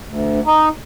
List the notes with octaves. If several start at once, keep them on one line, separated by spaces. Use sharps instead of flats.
D2
D#4